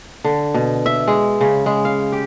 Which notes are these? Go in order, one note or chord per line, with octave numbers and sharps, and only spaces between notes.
D3
B2
E5
G#3
C#3
G#3
F5
G4